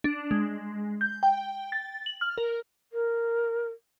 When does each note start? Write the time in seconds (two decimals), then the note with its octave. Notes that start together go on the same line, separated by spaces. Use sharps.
0.04 D4
0.31 G#3
1.01 G6
1.23 G5
1.72 A6
2.06 F#7
2.21 F6
2.38 A#4
2.90 A#4